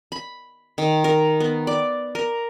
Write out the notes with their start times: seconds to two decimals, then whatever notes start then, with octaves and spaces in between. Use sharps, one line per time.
0.12 B5
0.78 D#3
1.04 A#4
1.40 B3
1.67 D5
2.15 A#4